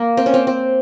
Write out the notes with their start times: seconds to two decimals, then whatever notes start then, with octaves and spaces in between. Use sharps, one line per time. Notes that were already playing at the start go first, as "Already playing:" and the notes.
Already playing: A#3
0.17 C4
0.26 C#4
0.34 C4
0.47 C4